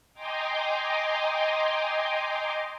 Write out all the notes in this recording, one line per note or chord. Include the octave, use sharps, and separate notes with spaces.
D#5 G5 G#5 A#5 C6 D6